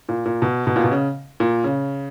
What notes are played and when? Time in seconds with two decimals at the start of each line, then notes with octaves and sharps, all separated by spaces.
0.09 A#2
0.26 A#2
0.42 B2
0.67 B2
0.76 A#2
0.84 B2
0.91 C#3
1.40 A#2
1.64 C#3